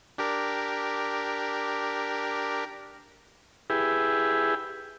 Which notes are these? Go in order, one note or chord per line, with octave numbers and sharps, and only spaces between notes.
D4 G4 A#4
E4 G4 G#4 B4